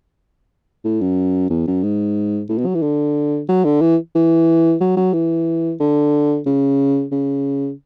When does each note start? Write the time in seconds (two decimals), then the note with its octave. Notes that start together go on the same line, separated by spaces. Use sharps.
0.84 A2
1.01 F#2
1.50 E2
1.67 F#2
1.83 G#2
2.49 A2
2.58 B2
2.66 F#3
2.75 E3
2.82 D3
3.48 F#3
3.64 D3
3.81 E3
4.15 E3
4.80 F#3
4.97 F#3
5.13 E3
5.80 D3
6.46 C#3
7.11 C#3